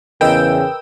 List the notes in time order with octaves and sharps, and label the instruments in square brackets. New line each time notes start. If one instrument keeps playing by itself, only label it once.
[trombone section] E2 C#3 [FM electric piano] A#4 B4 D#5 [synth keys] G5 E6